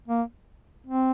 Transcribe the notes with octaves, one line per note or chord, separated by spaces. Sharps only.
A#3
C4